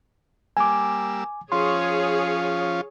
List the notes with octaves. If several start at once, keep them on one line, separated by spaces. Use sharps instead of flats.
G3 A#3 G#5 D6 E6
F3 C#4 F4 G#4 C#5 C6